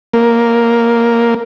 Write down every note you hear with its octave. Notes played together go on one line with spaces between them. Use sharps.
A#3